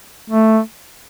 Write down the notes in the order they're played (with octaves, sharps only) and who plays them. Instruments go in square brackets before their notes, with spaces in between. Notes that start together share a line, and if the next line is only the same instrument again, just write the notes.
[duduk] A3